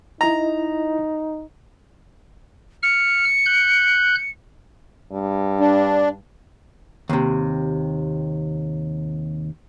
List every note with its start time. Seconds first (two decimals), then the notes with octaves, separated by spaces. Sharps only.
0.21 D#4 E4 D#5 A#5
2.83 F6 C#7
3.46 F#6 G6
5.13 G2
5.60 D4
7.09 D#2 C3